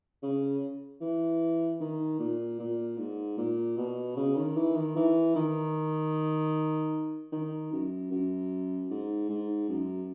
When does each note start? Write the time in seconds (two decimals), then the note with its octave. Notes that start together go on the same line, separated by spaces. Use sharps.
0.22 C#3
1.01 E3
1.80 D#3
2.19 A#2
2.59 A#2
2.98 G#2
3.37 A#2
3.77 B2
4.16 C#3
4.36 D#3
4.57 E3
4.76 D#3
4.96 E3
5.35 D#3
7.32 D#3
7.72 F#2
8.11 F#2
8.90 G#2
9.29 G#2
9.69 F#2